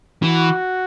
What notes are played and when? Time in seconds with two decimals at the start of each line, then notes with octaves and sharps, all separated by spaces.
0.22 E3 F#4